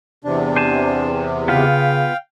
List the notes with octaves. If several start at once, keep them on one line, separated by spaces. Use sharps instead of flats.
E2 C3 D4
C5 G#5 A5
C#3 B3 F4 B4 F5 G5